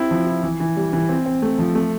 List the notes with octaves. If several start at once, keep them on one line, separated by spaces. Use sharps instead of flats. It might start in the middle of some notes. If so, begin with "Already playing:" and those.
Already playing: C4 E4 G4
F3
E4
E3
E3
G3
E3
C4
C4
A3
F3
A3